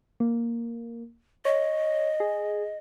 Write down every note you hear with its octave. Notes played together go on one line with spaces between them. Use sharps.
A#3
C#5 D#5
G#4